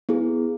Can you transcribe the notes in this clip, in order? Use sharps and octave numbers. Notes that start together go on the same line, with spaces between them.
B3 E4 G#4